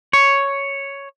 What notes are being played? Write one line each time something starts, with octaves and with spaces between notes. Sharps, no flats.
C#5